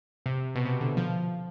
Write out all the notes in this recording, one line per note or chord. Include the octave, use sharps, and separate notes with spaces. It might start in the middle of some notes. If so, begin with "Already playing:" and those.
C3
B2
C3
D3
F3